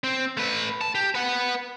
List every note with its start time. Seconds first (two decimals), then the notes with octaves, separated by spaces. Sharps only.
0.04 C4
0.37 A3 B4
0.81 A5
0.95 G4
1.15 B4 F#5